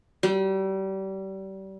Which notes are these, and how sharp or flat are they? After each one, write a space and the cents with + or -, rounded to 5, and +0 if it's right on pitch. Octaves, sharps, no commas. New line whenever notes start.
G3 -30